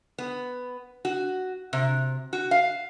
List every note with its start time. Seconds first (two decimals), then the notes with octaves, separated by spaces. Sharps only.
0.19 B3
1.05 F#4
1.73 C3
2.33 F#4
2.51 F5